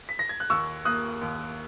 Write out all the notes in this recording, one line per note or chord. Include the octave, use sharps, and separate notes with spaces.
B6
A#6
G#6
F#6
D#2 C#6 E6
A#3 D#6 F#6
D#2